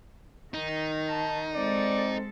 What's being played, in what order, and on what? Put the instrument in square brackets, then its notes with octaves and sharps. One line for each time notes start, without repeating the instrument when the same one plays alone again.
[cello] D#3 [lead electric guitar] D#4
[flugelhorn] A5
[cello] G#3 A4 [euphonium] C4 [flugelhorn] D5